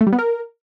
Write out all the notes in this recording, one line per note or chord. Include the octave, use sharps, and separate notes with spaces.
A3
G3
B3
A#4